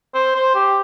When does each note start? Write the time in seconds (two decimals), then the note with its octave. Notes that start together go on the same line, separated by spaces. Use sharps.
0.15 C5
0.36 C5
0.55 G4